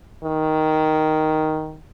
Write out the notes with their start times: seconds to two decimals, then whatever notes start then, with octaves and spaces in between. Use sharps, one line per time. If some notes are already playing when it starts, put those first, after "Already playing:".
0.24 D#3